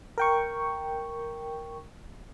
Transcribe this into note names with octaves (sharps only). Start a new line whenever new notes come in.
A#4 G5 C#6